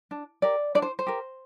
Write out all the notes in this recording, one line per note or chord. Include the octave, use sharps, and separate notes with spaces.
D4
G4 A#4 D5
D4 D5
C5
C5
G4 A#4